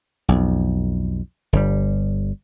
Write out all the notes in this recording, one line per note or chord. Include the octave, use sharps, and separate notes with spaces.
B1 F2
G1 G3